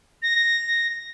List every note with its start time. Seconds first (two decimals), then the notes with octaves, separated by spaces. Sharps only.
0.23 A#6